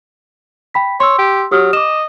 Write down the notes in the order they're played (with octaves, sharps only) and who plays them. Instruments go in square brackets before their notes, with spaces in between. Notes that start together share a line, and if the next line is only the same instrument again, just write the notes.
[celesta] G5 B5 B6
[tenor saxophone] C#5 [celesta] C6 E6
[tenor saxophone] G4
[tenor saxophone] F#3 [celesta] G4 D#6 F6
[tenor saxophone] D#5 [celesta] D6 E7